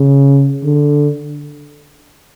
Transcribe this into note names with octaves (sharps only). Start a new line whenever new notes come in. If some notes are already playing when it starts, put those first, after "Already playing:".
Already playing: C#3
D3